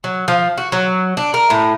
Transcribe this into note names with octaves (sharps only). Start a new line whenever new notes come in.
F#3
F3
F#4
F#3
D4
A#4
A2